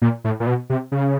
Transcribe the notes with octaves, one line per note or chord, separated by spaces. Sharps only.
A#2
A2
A#2
B2
C3
C#3